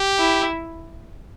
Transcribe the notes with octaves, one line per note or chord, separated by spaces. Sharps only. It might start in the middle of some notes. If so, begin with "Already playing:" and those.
Already playing: G4
E4